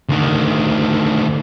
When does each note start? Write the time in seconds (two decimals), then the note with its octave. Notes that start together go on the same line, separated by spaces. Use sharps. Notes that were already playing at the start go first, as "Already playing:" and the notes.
0.09 D2 D#3